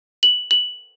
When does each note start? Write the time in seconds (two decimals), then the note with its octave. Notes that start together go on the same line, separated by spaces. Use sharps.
0.23 F#7
0.51 F#7